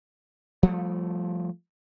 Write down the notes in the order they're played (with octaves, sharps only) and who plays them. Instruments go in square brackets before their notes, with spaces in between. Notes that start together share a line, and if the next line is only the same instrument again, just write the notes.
[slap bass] F3 G3 A3